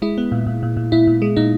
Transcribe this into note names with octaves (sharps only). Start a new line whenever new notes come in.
G#3 E4
B3
A#2
A#2
A#2
A#2
A#2 E4
A#2
G#3
A#2 D#4